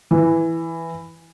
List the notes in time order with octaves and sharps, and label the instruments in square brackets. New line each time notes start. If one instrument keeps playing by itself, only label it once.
[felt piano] E3